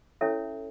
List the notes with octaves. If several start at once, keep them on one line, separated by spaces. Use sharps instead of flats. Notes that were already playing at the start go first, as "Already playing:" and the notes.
C#4 E4 A4 C#5 E5